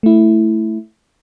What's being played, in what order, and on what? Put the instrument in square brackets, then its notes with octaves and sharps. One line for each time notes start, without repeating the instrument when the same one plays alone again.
[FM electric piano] A3 E4